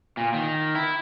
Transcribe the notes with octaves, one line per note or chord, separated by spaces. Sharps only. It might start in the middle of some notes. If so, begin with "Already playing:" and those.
A#2
D#3
E4